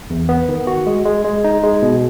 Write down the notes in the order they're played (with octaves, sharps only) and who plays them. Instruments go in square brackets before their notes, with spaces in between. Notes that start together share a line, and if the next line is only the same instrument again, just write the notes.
[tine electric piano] E2
B3
D#3
F#4
G#3
G#3
G#3
D#4
G#3
B2